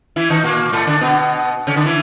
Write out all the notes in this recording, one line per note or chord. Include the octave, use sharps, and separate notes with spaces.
E3 E4
D#3 D#4
A#2 A#3
A2 A3
D3 D4
B2 B3
C#3 C#4
D3 D4
E3 E4